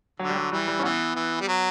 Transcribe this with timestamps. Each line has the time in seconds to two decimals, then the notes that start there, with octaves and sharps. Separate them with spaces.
0.19 D3 F#3
0.30 G3
0.35 F#3
0.52 E3 G3
0.68 G3
0.79 C#4
0.83 E3 B3
1.16 E3
1.41 G3
1.48 F#3